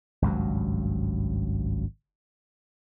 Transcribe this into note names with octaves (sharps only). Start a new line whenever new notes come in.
G#1 C#2 G2 F#3